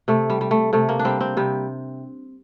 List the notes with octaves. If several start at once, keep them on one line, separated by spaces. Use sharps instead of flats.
C3 A3
G3
G3
A3
C3 A3
A#3
D4
G3 C4
C4
C3 G3